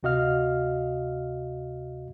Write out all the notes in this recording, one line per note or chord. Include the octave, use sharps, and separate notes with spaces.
D2 C3 F#4 D#5 F5 F6